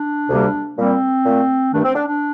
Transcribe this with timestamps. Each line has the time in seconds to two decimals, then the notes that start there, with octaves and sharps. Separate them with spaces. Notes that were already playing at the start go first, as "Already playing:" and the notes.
Already playing: D4
0.30 D2 C3 G3 A#3
0.77 A#2 G3 A#3 C4
1.24 A#2 A3
1.72 G2 D#3 A3 D4
1.84 C4
1.95 D4
2.08 D4